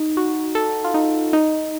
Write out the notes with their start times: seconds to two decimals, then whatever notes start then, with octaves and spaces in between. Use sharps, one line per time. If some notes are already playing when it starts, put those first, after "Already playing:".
Already playing: D#4
0.17 F#4
0.55 A4
0.84 F4
0.94 D#4
1.33 D#4